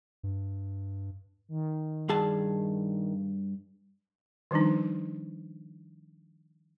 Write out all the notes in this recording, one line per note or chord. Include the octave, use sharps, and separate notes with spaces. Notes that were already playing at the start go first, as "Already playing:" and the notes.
G2
D#3
G2 G#4 A5
D#3 F3 G3 D4 D#4